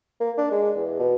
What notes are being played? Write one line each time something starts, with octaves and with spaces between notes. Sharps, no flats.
A#3
D4
G#3
E2
B2